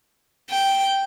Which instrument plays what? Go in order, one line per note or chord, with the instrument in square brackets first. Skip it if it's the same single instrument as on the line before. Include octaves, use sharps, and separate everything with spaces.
[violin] G5